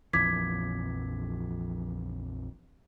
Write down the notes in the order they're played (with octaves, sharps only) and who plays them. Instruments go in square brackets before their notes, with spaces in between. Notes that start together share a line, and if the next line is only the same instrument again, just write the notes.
[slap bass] A#1 F2 E3 [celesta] D6 G#6 B6